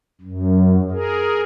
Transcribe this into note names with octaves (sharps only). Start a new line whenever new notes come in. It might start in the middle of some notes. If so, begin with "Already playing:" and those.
F#2
G#4 A#4